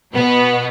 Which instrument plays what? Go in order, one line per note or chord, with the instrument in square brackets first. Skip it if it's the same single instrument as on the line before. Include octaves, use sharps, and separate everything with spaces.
[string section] B2 B3